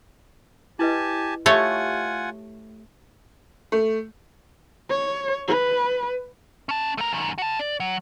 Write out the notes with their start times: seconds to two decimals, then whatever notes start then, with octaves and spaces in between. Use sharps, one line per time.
0.79 E4 G4 B4 D#5 G#5 A5
1.46 A3 F4 G4 C#5 E5 F#5 G#5
3.72 A3
4.89 C#5
5.48 B4
6.69 C#4 A5
6.98 A3 A#4
7.13 F#2 D#3
7.38 F#4 A5
7.59 D5
7.80 F#3